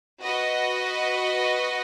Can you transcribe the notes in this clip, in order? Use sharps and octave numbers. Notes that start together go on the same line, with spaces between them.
F#4 B4 D#5